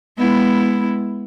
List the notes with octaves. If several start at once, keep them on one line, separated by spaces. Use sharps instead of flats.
G#3 B3 E4